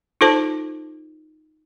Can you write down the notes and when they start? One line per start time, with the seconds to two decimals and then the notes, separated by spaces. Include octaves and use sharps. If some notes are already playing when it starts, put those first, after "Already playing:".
0.21 D#4 F4 A4 C5 A5